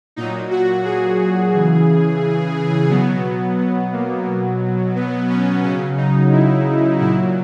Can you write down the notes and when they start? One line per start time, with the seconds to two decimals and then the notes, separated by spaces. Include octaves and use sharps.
0.16 A#2 F#3 D#4
0.51 F#4
0.85 G#4
1.19 G#4
1.53 C#3 E3 G#4
2.90 B2 F#3 B3
3.59 B3
3.93 A#3
4.27 B2 F#3
4.96 B3
5.29 C#4
5.63 C#3 F#3 C#4
5.97 D#4
6.33 E4
7.00 A#2 F#3 E4